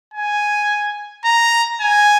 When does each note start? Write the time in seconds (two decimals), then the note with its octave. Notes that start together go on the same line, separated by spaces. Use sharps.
0.14 G#5
1.25 A#5
1.81 G#5